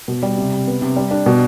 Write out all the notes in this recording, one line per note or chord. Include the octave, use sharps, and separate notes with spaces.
B2
G3
C3
C3
B3
C3
G3
D4
B2